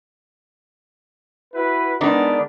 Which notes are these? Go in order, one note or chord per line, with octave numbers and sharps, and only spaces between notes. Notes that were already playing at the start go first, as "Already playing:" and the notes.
E4 F#4 B4
D#3 G#3 B3 D4